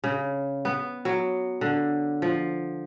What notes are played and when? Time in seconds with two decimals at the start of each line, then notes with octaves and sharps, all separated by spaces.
0.04 C#3
0.65 B3
1.05 F#3
1.61 D3
2.22 F3